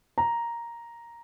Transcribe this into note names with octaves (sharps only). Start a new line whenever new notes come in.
A#5